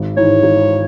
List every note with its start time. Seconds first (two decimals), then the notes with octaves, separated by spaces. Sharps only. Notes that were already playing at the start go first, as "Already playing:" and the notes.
Already playing: G#1
0.17 G#2 E3 C#5
0.43 G#1